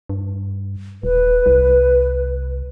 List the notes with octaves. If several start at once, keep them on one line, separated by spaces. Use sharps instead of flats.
G2
D#1 B4
C2